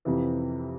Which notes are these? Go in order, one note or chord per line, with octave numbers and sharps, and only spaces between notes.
F2 C3 E3